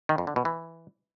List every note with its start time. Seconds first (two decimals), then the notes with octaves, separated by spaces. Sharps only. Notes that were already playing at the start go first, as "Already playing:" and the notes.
0.09 D#3
0.18 F2
0.27 D3
0.36 B2
0.45 E3